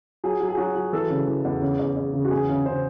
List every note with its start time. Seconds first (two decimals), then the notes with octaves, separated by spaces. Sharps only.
0.24 F#3 G#4
0.40 F#3
0.49 G#4
0.57 F#3 F#4
0.75 F#3
0.93 E3 A4
1.10 C#3
1.27 E3
1.45 E2
1.62 C#3
1.79 E2
1.97 E2
2.13 C#3
2.24 F#4
2.31 E2 G#4
2.49 C#3
2.66 C#3 C5